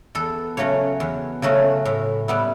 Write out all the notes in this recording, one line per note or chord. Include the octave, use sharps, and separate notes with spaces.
E2 A4
C#3 F#3 A3 C#4 C#5
E2
C#3 F#3 A3 C#4
A2
G3 B3 E4